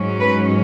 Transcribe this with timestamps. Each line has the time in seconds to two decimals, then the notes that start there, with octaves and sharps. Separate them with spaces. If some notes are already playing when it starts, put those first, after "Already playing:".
Already playing: G#2 F#3 C#4
0.20 B4